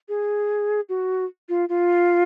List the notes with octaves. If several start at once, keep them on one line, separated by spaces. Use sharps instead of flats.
G#4
F#4
F4
F4